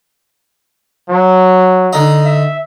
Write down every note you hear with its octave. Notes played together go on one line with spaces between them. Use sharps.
F#3
D3 D#4
E5